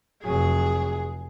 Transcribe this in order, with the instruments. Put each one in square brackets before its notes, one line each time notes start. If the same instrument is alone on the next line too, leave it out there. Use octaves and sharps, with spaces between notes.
[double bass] F1 F#3 [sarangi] G#4